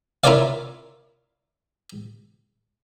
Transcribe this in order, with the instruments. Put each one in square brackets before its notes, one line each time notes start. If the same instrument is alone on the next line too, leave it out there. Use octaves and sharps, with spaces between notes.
[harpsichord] E4 F4 A#4 C#5 D5 F5